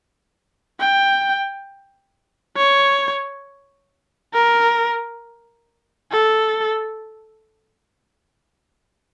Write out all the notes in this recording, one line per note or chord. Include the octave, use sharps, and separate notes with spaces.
G5
C#5
A#4
A4